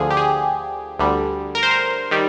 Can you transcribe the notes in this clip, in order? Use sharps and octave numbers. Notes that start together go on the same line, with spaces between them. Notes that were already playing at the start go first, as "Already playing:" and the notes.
Already playing: D2 D3 F3 G#4
G4
G#4
D2 D3 G3
A#4
C5
A#4
D#3 G3